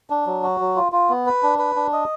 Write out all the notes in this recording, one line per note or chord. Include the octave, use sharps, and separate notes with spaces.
D4
F#3
F#4
F#3
F4
F4
B3
B4
D4
B4
D4
D#5